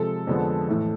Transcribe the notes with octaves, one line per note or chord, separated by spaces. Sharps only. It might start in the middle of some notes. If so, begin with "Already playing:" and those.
Already playing: C3 F3 G#3 A4
F2 D3 F3 G#3 B3
A2 E3 A3